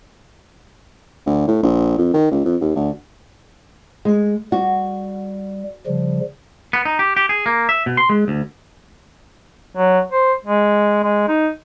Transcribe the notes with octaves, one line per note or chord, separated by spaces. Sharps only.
D2
A2
A#1
F2
D#3
C#2
F2
D#2
D2
G#3
G3 F#4
C#3 F3 G3
B3
D#4
G4
G4
G#4
A#3
E5
B2
C6
G#3
D2
F#3
C5
G#3
G#3
D#4